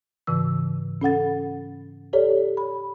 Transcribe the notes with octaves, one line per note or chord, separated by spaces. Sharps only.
G#2 C#3 E3 E6
C#4 A4 F#5 A6
G4 A4 C#5 D5
B5